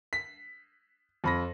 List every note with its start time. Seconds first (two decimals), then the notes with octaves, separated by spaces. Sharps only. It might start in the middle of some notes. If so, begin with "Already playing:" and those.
0.13 B6
1.24 F2 B5 A#6